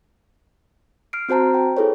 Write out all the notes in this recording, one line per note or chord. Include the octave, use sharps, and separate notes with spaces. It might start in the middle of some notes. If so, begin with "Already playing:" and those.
F6 C7 D7
C4 F#4 C5 A5 A#5
G5
E4 G#4 A4 B4 C#5